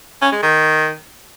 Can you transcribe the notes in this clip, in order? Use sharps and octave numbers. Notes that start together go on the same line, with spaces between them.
C#4
G#3
D#3